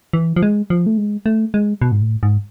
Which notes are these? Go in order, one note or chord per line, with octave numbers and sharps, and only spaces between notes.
E3
F3
G#3
F3
A3
G#3
A3
G#3
B2
G#2
A2
G#2